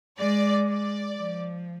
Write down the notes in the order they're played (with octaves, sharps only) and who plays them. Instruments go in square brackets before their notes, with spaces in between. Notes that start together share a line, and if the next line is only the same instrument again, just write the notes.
[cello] G#3 [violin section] D5
[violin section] D5
[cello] F3